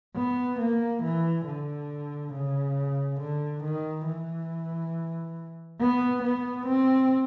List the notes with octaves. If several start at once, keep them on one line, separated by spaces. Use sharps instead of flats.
B3
A#3
E3
D3
C#3
D3
D#3
E3
B3
B3
C4